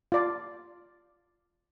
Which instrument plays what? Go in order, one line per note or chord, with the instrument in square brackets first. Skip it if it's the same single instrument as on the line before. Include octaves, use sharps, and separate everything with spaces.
[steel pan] F4 D5